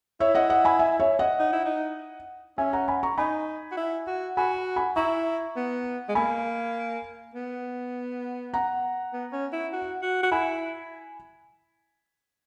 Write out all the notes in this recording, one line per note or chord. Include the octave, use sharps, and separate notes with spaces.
E4 C#5 E5
D#5 F#5
D#5 F#5
G#5 B5
E5 G#5
C#5 E5
D#5 F#5
D#4
E4
D#4
C#4 E5 G#5
F#5 A#5
G#5 B5
A#5 C#6
D#4 G#5 B5
F#4
E4
F#4
F#4 G#5 B5
G#5 B5
E4 A#5 C#6
B3
G#3
A#3 G#5 B5
B3
F#5 A#5
B3
C#4
E4
F#4
F#4
F#4
E4 G#5 B5